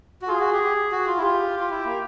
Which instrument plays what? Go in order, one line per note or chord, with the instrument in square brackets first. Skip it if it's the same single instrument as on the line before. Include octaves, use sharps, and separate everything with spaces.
[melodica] F#4
[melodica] F4 [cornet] G#4
[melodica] F#4
G4
G4
F#4
F4
E4
[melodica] F4 [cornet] G4
[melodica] F4
E4
A#3